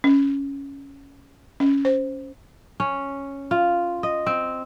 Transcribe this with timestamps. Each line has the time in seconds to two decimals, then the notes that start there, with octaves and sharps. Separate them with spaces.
0.04 C#4
1.60 C#4
1.85 C5
2.80 C#4
3.51 F4
4.03 D#5
4.26 C4